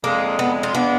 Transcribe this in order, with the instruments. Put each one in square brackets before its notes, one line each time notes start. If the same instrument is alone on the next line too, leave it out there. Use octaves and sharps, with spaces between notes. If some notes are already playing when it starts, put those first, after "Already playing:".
[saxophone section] F2 D3 G#3 [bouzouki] A#3
[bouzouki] B3
F4
[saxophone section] F3 G#3 D4 [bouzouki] B3